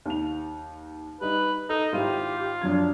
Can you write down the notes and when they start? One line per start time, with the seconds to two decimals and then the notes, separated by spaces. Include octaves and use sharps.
0.06 D#2 F7
1.21 G3 D#4 B4
1.69 D#4 A4
1.93 G#1 E4 F4 G4 D#7
2.61 F#2 F3 D4 G#6